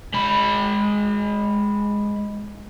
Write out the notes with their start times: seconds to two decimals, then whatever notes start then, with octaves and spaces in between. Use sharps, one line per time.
0.14 G#3 B5